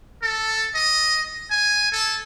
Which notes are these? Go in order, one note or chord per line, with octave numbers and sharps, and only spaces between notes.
A4
D#5
G#5
A4